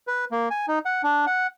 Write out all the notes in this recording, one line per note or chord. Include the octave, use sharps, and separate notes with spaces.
B4
A#3
G#5
D#4
F#5
D4
F#5